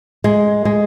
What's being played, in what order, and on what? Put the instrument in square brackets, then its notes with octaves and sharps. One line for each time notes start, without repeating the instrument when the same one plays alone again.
[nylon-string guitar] G#3
G#3